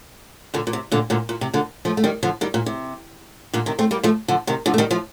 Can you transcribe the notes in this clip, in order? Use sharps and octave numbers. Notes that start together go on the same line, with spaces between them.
A#2 D3
A#2
C3
A#2 D3
A#2 D3
A#2
C3
A#2 D3
F3 A3
A3
D#3 G3
D3 F3
D#3 G3
A#2
C3
A#2 D3
C3 D#3
A3 C4
G3 A#3
F3 A3
D3 F3
C3 D#3
D3 F3
A3
D#3 G3
F3 A3